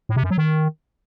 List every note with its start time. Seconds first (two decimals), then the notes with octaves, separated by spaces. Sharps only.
0.09 A2
0.16 C3
0.23 F#2
0.31 F#3
0.38 D#3